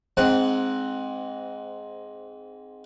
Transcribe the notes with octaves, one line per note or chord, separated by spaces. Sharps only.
G#2 C4 F#5